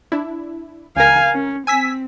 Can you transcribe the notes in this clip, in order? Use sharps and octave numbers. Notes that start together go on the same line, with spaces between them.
D4 E4
C#2 A#4 F5 G#5
C#4
C4 G#5 E6 B6